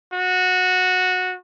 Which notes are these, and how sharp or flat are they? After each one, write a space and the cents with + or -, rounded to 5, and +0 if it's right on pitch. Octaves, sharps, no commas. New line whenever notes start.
F#4 -15